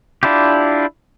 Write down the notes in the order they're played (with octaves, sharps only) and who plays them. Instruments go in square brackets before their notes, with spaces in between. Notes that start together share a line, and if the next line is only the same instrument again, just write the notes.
[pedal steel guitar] D4 E4 F4 G4